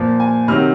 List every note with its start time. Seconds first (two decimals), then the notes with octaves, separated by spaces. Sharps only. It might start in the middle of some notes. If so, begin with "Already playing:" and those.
Already playing: A#2 F3
0.20 G#5
0.48 C3 D#3 F#3 F6